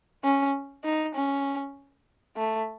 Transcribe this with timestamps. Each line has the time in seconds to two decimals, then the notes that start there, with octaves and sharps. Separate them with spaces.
0.24 C#4
0.85 D#4
1.15 C#4
2.37 A3